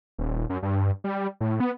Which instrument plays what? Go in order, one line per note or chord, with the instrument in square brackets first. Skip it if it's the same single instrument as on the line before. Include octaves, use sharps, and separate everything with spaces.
[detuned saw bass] D#1
F#2
G2
G3
A2
B3